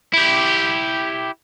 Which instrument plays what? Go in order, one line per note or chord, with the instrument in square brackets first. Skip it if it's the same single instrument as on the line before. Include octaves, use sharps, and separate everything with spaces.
[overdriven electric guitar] E4 G4